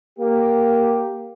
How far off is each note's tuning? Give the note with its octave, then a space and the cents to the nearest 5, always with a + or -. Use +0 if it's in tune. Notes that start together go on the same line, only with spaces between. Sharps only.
A#3 +0 G4 +0